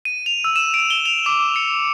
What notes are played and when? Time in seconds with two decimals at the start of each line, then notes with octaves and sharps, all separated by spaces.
0.05 D#7
0.26 F7
0.44 E6
0.56 E7
0.74 D7
0.90 G7
1.06 F7
1.26 D6
1.56 C#7